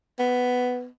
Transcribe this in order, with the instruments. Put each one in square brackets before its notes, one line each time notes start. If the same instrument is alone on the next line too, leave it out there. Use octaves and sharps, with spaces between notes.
[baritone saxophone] B3